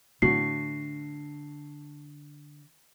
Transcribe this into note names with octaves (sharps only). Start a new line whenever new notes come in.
A2 D3 F#4 C7